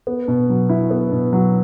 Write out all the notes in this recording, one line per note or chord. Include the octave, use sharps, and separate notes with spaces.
B3
B2
F#3
E4
B3
B2
F#3